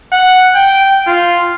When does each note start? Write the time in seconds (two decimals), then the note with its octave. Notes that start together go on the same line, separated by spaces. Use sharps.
0.12 F#5
0.55 G5
1.07 F4